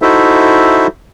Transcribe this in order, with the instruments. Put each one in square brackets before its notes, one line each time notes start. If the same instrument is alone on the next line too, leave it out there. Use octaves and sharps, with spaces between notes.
[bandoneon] D#4 E4 F#4 A4 C5 E5